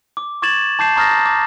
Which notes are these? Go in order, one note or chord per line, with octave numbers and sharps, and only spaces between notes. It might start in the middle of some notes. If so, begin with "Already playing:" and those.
D6
C#6 D6 G#6 A6 E7 F#7
A5 D6 G6 C7 E7
A#5 C#6 D#6 F6 A6 A#6
D6